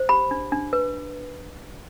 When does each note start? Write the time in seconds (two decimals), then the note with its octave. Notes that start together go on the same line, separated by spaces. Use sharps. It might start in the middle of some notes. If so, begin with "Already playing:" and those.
Already playing: C5
0.09 G4 B5
0.31 D4
0.52 D4
0.73 B4